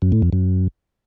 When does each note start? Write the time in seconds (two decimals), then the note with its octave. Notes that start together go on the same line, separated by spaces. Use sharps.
0.02 F#2
0.12 A2
0.22 F2
0.33 F#2